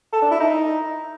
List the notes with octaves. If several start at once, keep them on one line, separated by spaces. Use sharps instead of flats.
A4
D4
E4
D#4